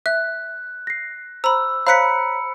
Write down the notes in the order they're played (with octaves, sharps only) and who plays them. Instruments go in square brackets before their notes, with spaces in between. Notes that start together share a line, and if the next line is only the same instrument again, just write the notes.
[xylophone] E5 [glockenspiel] F#6
[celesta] A#6 C7
[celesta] C5 [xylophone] A#5 B5 [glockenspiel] E6
[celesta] C5 C#5 A#5 [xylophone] F5 F#6 B6 [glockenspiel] B5 C#7